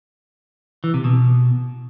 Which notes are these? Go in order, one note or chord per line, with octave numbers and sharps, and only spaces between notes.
E3
C3
B2